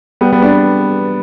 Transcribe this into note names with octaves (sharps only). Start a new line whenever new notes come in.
G3 B3
G3 B3
B3 D4